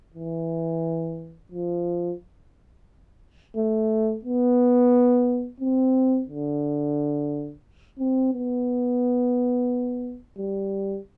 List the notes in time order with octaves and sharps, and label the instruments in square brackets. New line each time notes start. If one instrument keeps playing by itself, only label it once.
[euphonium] E3
F3
A3
B3
C4
D3
C4
B3
G3